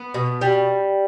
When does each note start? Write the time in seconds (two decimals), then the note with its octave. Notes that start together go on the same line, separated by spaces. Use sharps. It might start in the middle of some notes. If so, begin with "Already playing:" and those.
Already playing: B3
0.14 B2
0.41 G3